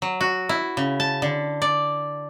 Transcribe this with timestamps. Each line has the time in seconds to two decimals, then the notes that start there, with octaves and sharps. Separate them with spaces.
0.02 F#3
0.21 F#4
0.49 E4
0.77 C#3
1.00 A5
1.22 D3
1.62 D5